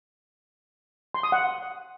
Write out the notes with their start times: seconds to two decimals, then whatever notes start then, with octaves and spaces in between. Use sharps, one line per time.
1.14 C6
1.23 D#6
1.32 F#5